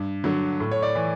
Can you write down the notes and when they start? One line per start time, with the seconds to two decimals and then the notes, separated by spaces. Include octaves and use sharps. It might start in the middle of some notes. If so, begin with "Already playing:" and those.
Already playing: G2
0.24 D3 F#3
0.60 A2
0.71 C#5
0.82 D5
0.95 E3